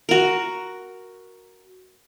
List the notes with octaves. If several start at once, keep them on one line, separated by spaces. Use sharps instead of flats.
F#4 A#4